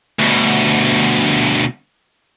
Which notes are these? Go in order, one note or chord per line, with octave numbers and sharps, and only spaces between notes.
D2 B2